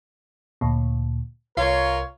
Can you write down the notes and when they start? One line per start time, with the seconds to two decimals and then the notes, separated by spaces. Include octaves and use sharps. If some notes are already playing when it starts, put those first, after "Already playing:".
0.61 D2 A#2
1.57 C2 F4 A#4 C#5